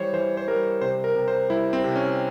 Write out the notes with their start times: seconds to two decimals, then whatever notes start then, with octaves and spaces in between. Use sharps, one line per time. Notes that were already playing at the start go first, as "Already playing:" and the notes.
Already playing: E3 G3 C5 C#5
0.13 E3 C5
0.37 C5
0.48 G3 A#4
0.81 C3 C5
1.04 A#4
1.16 C3
1.28 C5
1.50 G3 E4
1.73 C4
1.84 C3
1.96 C#4